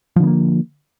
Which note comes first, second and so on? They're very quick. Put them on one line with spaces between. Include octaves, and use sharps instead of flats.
F3 D3 B3 A#3